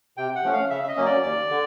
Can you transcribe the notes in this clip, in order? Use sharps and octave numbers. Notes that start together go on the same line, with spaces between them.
C3 G5
F#5
F3 A3 C#4
F5
C#3 E5
E5
D#5
F#3 A#3 C#4
D5
D#2 D5
D3